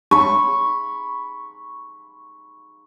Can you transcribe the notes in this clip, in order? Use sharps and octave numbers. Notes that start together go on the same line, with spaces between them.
B5 C#6